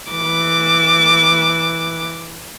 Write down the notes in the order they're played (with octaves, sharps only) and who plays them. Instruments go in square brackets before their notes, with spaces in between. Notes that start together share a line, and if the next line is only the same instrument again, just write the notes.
[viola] E3 D6